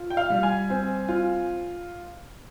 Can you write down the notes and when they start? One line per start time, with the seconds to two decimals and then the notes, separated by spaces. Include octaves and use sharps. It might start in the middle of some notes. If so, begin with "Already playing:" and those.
Already playing: F4
0.10 G5
0.17 F5
0.30 G3
0.43 G#5
0.70 C4
1.08 F4